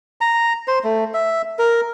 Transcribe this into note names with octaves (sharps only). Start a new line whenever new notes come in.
A#5
C5
A3
E5
A#4